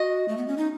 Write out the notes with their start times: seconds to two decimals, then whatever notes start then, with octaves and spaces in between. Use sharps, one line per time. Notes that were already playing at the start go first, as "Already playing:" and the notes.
Already playing: F#4 D#5
0.28 A3
0.37 B3
0.48 C#4
0.58 D#4